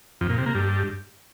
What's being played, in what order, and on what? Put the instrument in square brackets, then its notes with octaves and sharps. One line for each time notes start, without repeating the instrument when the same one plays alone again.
[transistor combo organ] F2
A#2
C3
A#3
G2